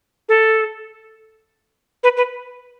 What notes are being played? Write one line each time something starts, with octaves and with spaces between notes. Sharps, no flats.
A4
B4
B4